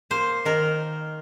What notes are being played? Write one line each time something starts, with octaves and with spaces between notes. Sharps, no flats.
A#3 C5
D#3 A#4